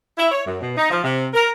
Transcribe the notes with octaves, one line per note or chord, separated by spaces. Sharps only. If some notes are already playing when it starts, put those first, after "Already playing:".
E4
C#5
F#2
B2
D#4
F3
C3
A#4